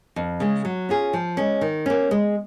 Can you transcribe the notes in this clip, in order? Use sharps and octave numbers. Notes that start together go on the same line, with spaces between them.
F2
C#3 G#3
F#3
C#4 F4 G#4
F3
G#3 C#4
D#3
A#3 C#4
G#3